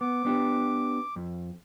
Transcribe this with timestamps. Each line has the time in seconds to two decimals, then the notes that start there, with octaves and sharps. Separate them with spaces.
0.01 B3 D6
0.25 B3 D4 G4
1.16 F2